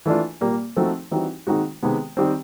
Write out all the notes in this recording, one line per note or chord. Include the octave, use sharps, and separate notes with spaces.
E3 A3 D4 F4
A#2 G3 A#3
F3 A3 C4 D#4 F#4
E3 G3 C4 D#4 F#4
D#3 G#3 C4 D#4 F#4
C3 D#3 G#3 B3
D#3 G3 C4